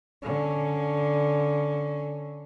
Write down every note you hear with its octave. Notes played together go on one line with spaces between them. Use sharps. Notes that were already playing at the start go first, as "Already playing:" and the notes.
D3 C#4